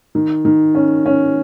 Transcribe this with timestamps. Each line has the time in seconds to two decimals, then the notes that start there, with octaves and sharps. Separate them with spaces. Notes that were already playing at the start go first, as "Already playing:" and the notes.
0.15 D#3
0.45 D#3
0.75 C#4
1.06 C#4